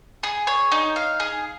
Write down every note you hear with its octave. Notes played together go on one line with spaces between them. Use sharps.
G#4
C#5
D#4
F5
G#4